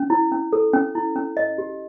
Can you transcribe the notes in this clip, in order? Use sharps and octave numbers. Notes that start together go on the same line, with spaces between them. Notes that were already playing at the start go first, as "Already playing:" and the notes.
Already playing: C#4
E4
C#4
A4
C#4
E4
C#4
D#5
G4